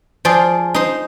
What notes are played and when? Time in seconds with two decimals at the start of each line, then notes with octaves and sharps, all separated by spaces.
0.25 F3 F4 G#4 D5
0.74 D#4 C5